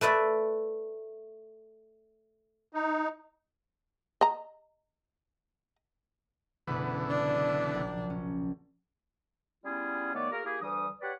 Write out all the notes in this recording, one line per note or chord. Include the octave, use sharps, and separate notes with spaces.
A3 B4 D5 E5
D#4
D#5 A#5
F#1 B2 D3 E3 B3 B5
D4
A#1
C#4
G3 B3 C#4 E4 F4 G#4
D#3 A3 B3 C#5 D5
A#3 F#4 G#4 A#4
A#3 E4 G4 G#4
D2 E3 G3 D4 D#6
G4 B4 C#5 D5 F#5